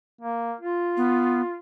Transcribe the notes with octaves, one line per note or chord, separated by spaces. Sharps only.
A#3
F4
B3